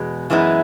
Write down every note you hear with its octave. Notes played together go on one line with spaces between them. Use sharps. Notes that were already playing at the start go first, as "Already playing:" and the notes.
Already playing: E2 B2 G#3
F#2 E3 G#3 B3 E4